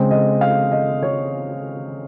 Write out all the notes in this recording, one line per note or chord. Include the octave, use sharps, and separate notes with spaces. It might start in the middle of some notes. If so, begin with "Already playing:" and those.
Already playing: C#3 G#3 C4 C5
D#5
F5
D#5
C#5